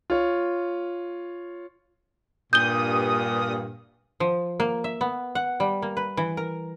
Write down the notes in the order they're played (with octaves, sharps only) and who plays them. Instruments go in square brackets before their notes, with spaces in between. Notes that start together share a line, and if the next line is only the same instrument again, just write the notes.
[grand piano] F4 C#5
[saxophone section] G2 A#2 [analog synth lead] D#6 [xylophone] G6 G7
[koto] F3
A#3
E5
B3
F#5
G3
A#3
B4
E3
A#4